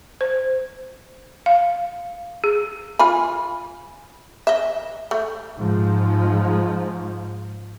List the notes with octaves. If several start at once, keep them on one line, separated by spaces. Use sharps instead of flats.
C5
F5
G#4
F4 G#5 B5
D#5 E5
A3
G#2 F3